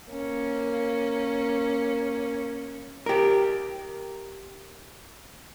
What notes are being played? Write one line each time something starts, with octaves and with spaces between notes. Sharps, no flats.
A#3 C#4
G4 A#4